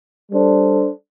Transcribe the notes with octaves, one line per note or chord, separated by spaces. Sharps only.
G3 D4 A4 C5